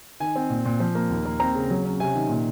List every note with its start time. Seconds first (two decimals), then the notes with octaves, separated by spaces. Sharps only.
0.20 D#3 G#5
0.36 C4
0.50 A#2
0.65 A#2
0.80 F3
0.95 A#3
1.10 D#2
1.25 A#3
1.40 C4 A#5
1.55 C#3
1.70 F#3
1.85 C#4
2.00 C3 G#5
2.15 D#3
2.29 A#2